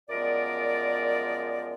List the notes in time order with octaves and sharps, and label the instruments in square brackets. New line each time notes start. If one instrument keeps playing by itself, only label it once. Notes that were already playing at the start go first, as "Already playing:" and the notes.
[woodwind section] F#2 F3 G#3 B3 A#4 D5